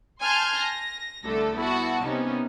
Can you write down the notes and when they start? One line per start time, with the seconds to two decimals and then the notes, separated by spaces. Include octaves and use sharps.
0.21 G#5 A5 C6 F6 G6 G#6
0.62 A#6
1.26 C2 D3 A3 A4
1.59 B3 E4 F#4 A5
2.01 C3 B3 C#4 D#4